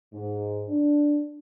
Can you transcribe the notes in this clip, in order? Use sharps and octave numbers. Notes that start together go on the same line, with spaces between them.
G#2
D4